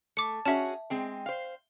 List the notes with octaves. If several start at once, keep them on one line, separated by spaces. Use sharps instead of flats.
A3 D6 C#7
C#4 F#4 G#4 E5 A5
G#3 C4 G5
C5 F5